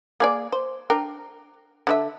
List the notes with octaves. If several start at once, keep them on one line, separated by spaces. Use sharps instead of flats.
A#3 G#4 D5
C5
D4 A#4 G5
D3 D4 E5